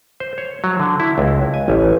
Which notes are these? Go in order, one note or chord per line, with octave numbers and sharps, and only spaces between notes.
C5
C#5
F#3
D3
E4
C#2
G#5
A1